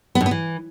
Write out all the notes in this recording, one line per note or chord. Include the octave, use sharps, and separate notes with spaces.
B3
F#2
B3
E3